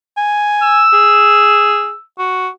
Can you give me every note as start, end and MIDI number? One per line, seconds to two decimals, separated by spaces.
0.17 0.85 80
0.64 2.04 88
0.93 1.93 68
2.18 2.48 66